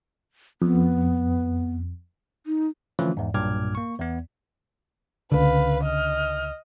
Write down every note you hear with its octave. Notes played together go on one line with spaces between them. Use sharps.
F2 B3
D#4
D3 E3 F3 A3 C#4 F4
E2 G#2
B1 G2 A#2 D6 F6 G#6
A#3 C#6
E2 B3
C#2 D3 B4 F5
D#5 F6